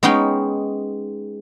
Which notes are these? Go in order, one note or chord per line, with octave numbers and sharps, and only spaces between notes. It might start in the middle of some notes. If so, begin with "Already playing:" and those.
G#3 B3 C#4 D#4 G#4 G5